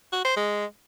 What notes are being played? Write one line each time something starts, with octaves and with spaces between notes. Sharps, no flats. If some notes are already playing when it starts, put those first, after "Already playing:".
F#4
C5
G#3